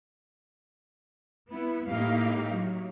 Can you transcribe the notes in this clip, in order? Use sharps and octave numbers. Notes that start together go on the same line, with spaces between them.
B3 E4
A2 A#3 D#4 E4 G4 F5
F#3